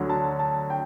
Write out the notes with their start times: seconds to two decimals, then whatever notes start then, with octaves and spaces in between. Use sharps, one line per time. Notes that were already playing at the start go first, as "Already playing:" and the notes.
Already playing: D2 D3 F#3
0.09 A5
0.39 A5
0.70 G5